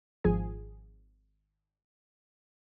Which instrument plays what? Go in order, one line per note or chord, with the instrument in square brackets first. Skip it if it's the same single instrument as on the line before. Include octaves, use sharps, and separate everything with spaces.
[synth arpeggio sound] G#1 F3 G#4 G#5